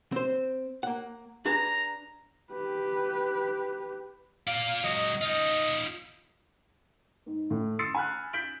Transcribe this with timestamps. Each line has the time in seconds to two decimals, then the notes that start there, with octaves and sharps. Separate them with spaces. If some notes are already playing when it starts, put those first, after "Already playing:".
0.12 C4 C5
0.83 A#3 F#5
1.45 D4 G#4 B4 A#5
2.51 G4 B4
4.47 F4 D5 F5
4.84 C#2 F#3 D#5
5.21 D#4 F4 D#5
7.26 G#2
7.50 A2
7.79 C6 D#6 E6 A6 C7 C#7
7.94 G#5 B5 F6 F#6
8.33 G6 B6 D7 F#7